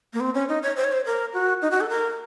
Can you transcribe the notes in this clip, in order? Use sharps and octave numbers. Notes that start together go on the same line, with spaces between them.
A#3
C4
C#4
D#4
C#5
C5
C#5
C5
A#4
F#4
D#4
F#4
A4
A#4